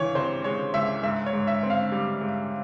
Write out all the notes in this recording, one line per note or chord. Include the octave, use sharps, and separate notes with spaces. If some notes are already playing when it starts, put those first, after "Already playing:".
Already playing: C#2 E3 C#5
C3 C5
G#3 C#5
C#2 E5
G#2 E5
C#5
G#2
E5
C4
F5
G3
G#2